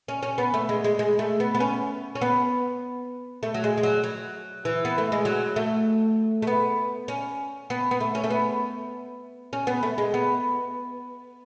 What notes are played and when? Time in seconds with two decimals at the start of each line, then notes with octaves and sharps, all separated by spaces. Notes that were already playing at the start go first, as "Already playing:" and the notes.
0.08 C#4
0.23 C#4
0.38 B3
0.54 A3
0.69 G#3
0.84 G#3
0.99 G#3
1.19 A3
1.40 B3
1.55 B3
1.60 C#4
2.15 C#4
2.21 B3
3.43 A3
3.54 F#3
3.64 G#3
3.77 G#3
3.83 F#3
4.04 F#3
4.65 E3
4.85 B3
4.98 A3
5.12 G#3
5.25 F#3
5.56 A3
6.42 A3
6.47 B3
7.08 C#4
7.70 B3
7.91 B3
8.01 A3
8.15 C#4
8.24 A3
8.30 B3
9.53 C#4
9.67 B3
9.83 A3
9.98 G#3
10.14 B3